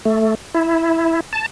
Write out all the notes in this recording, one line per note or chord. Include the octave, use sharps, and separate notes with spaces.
A3
E4
A5